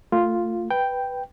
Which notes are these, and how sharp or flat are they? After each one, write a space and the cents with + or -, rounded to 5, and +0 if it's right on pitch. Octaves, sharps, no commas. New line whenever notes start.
A3 +25 F4 +0
B4 +0 G5 +0